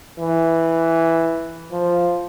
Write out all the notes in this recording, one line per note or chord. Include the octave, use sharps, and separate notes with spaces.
E3
F3